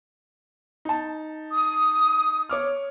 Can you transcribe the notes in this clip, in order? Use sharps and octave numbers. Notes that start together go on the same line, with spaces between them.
D#4 A5
D#6
C#5 D6 F6